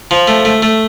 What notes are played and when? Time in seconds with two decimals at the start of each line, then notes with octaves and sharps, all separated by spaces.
0.11 F3
0.28 A3
0.45 A3
0.62 A3